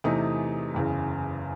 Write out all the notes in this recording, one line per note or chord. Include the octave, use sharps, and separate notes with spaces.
E2 C3 E3 A3 D#4 D#6
F#1 E2 C#3